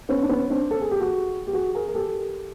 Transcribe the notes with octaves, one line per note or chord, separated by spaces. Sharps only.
B3 C#4
D4
B3 C#4
C4 D4
A4
G#4
G4
F#4 G#4
G4
F#4 G#4
G#4 A#4
A#4
G4 A4